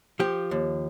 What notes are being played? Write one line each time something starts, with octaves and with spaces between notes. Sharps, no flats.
F3 G4
D#2